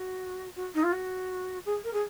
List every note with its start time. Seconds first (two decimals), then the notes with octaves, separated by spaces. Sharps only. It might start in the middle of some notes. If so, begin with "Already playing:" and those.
Already playing: F#4
0.56 F#4
0.74 D#4
0.83 F4
0.92 F#4
1.65 G#4
1.84 A#4
1.93 G#4